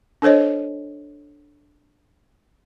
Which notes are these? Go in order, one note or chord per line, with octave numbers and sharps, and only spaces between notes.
D4 A4 C5 C#5 D#5